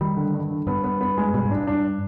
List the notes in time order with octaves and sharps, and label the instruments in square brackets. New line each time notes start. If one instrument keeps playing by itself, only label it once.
[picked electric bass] D#3 [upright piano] G3
[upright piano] D3
G2
D3
[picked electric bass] G2 [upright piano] B3
[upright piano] B3
B3
G#3
[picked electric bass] B2 [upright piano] G3
[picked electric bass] G#2
[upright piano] D4
[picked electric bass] G2
[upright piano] D4